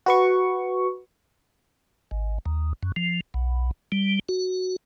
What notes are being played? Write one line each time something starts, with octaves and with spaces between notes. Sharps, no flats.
F#4 B4 C#6
G#1
D#2
F#2
F3
B1
G3
F#4